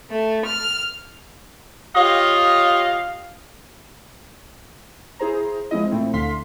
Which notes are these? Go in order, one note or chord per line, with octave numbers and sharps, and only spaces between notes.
A3
F6
F4 G4 C#5 D#5 F5
E4 G#4 C5 A#5
F3 G#3 B3 C4 E4 D#5
A#2 A3 C4 E4
D2 D3 A3 F5 C6 B6